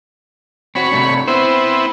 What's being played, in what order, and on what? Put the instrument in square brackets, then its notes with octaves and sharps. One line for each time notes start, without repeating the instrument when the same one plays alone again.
[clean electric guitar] C4 F#4 [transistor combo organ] C#5 B5
[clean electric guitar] C3 A3 D4
[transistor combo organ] B3 C4 E4 [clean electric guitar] C5